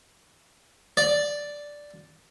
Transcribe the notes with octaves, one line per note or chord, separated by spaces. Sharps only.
D5